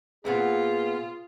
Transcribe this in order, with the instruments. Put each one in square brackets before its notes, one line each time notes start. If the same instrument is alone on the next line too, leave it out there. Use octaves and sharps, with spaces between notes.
[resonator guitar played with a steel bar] A#2 B3 C4 [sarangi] F4 [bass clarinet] G#4